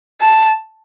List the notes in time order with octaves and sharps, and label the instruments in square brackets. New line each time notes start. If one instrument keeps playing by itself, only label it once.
[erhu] A5